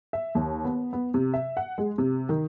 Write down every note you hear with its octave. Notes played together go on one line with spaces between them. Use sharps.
E5
D#2
B3
B3
C3
E5
F#5
G#3
C3
D#3